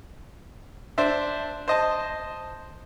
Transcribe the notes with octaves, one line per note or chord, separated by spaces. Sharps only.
D4 C5 E5
C5 D#5 A5